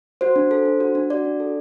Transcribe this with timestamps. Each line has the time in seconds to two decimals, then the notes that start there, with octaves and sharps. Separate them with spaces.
0.21 F#4 C5
0.36 D4
0.51 A4
0.65 D4
0.80 F#4
0.95 D4
1.10 F#4 D5
1.25 D4
1.40 A4